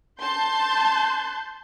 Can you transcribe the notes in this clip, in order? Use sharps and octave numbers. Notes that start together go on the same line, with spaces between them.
A5 C6 G6